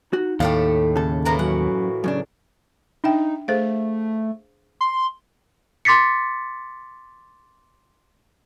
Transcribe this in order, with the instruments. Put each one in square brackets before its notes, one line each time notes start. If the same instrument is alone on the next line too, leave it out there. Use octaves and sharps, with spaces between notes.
[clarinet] D#4 [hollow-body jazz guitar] F#4
[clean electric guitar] D#2 [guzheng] A2 A3 G4 [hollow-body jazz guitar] A4 F5
[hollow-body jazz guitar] C#3 A4
[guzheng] A2 E3 A#3 [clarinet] A#5
[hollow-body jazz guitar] F#2 [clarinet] F#4 [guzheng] F#5
[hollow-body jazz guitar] F#2 C#3 D4
[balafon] D4 E5 G5 [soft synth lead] D#4
[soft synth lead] A3 [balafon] G#4 C5 F5
[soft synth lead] C6
[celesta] C6 D6 A6 B6 C#7